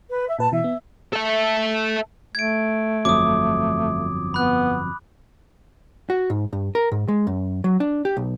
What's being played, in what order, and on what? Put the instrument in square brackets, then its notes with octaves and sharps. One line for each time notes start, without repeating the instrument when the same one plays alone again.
[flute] B4
E5
[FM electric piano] A#2 B4 [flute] A5
[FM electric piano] B2 E3 [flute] E5
[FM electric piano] B3
[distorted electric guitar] A4 E5
[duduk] A3 [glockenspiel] G#6 D7
[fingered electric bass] G1 F2 F#3 [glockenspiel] D6 D#6
[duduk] B3 [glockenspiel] B5 F#6
[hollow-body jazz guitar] F#4
G#2
G2
A#4
G#2
G#3
F#2
F#3
D4
G4
B1